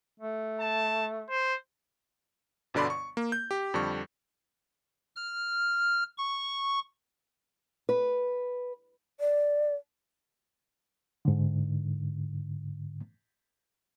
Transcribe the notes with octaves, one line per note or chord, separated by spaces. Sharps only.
A3
A5
C5
G1 B2 D3 D5 B5 C6
C#6
A#3
G6
G4
F2 D3 G3 C#6
F6
C#6
B4
D5
G#2 D3